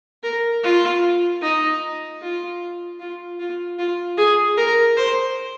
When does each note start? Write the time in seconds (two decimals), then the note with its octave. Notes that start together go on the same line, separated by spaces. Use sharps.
0.23 A#4
0.64 F4
1.42 D#4
2.22 F4
3.00 F4
3.39 F4
3.79 F4
4.18 G#4
4.57 A#4
4.97 C5